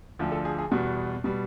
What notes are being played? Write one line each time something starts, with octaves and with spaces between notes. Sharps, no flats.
D2 D3 F3
A4
G#4
G#4
E2 B2 G3 F#4
B2 G3